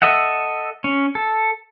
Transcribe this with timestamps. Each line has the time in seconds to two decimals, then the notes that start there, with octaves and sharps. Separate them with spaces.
0.02 A4 D#5 E5 F#5
0.84 C#4
1.15 A4